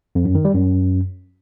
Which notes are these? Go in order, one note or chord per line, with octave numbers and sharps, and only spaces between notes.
F2
F#2
D#3
G3
F#2